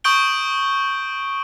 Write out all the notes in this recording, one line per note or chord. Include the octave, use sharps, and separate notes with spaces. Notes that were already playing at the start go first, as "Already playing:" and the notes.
C#6 D#6 G6 D7 G7